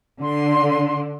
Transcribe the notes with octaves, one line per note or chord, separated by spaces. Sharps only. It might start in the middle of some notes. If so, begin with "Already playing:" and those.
D3 C6